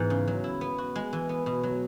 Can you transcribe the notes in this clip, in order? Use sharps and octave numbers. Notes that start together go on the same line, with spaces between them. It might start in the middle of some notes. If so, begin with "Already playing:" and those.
Already playing: G#2 E3 B3
C#3
F#3
E4
B3
F#4
G#3
E3
B3
B2
F#3